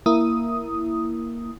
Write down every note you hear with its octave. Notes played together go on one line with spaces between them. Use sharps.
A#3 E4 D#6